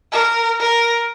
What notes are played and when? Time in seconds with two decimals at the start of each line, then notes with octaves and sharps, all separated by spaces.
0.12 A#4
0.60 A#4